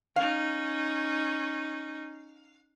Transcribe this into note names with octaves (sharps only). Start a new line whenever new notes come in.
C#4 D#4 F5